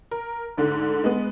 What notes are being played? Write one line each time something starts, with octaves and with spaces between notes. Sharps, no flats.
A#4
D2 G#2 D3
G#3 B3